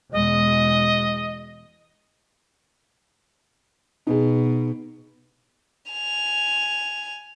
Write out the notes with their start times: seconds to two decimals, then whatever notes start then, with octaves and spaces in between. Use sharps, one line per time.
0.12 E2 B2 G#3 D#5
4.07 B2 D#4 G#4
5.92 G#5 F7